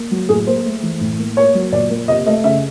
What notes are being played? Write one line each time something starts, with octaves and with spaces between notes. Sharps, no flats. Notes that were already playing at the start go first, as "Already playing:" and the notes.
Already playing: A#3
F#3
A2 G#4
A#3 C5
A3
E3
A2
A#3
A#3 C#5
F#3
A#2 D5
A#3
C3 D#5
A3 D#5
C#3 E5